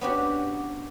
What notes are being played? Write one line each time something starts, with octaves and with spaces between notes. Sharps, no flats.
B3 C#4 D4 F#4 G4